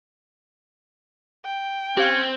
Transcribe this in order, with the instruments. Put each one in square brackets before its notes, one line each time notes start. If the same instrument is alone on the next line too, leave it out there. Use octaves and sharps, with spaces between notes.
[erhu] G5
[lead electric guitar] C4 [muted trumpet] C#4 [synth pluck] G4 F5 F#6